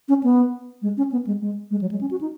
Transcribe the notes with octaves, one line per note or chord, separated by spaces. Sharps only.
C#4
B3
G#3
C#4
B3
G#3
G#3
G#3
F#3
G#3
C#4
F#4
D#4